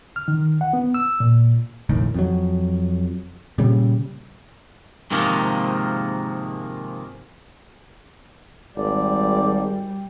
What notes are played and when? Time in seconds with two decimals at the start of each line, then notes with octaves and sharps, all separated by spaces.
0.16 F6
0.28 D#3
0.61 F#5
0.73 B3
0.94 E6
1.20 A#2
1.89 F1 A#1 A2 D#3
2.14 F2 F#3
3.58 A#2 C#3 G3
5.11 G#2 C3 D#3 F3 G#3 A#3
8.77 G#1 G3 D5